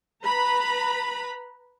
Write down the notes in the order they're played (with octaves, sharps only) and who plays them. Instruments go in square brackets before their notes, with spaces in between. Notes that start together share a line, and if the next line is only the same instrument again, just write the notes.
[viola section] B4 A#5 B5